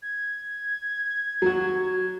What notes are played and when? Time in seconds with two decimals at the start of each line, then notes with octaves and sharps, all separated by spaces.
0.02 G#6
1.42 F#3 F#4